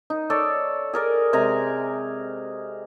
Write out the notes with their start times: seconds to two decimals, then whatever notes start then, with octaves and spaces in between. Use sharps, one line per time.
0.10 D#4
0.30 A4 C#5 D5
0.94 G#4 A#4 D5
1.33 C3 G#3 G#5 A#5